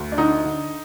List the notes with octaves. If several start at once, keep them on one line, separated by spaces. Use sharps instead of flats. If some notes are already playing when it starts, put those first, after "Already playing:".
Already playing: D2
D4
D3 D#4
D3